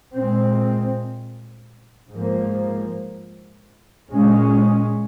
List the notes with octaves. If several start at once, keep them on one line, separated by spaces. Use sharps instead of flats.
A#2 G#3 C4
G#2 F3 A#3
A#2 G#3 C#4